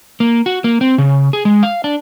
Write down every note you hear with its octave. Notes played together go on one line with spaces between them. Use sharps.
A#3
F#4
A#3
C4
C#3
G#4
G#3
F5
D4